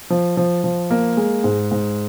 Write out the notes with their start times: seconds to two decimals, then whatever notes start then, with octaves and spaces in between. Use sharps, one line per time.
0.10 F3
0.37 F3
0.64 F3
0.91 A#3
1.17 G#3
1.44 G#2
1.71 G#2